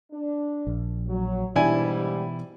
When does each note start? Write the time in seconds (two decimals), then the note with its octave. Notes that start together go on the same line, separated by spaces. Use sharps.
0.12 D4
0.67 A#1
1.07 F#3
1.56 G#2 B2 E3 G3 D4 E4 G#5